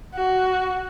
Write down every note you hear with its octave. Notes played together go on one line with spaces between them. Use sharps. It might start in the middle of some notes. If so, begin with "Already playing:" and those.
F#4